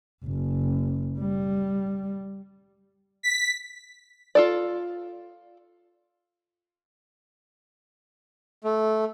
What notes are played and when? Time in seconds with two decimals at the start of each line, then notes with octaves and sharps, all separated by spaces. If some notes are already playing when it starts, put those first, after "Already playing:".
0.25 F#1
1.19 G3
3.23 B6
4.35 F4 A4 D5
8.64 A3